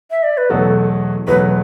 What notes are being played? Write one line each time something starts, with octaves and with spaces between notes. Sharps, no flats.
E5
D5
B4
E2 B2 F#3 A3 A4
E2 B2 F#3 A3 B4